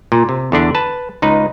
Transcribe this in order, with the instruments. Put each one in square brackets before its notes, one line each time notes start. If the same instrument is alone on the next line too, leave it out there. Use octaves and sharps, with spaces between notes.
[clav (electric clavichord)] A#2
C3
E2 D3 D4
B4 A5
C#2 D#4 B4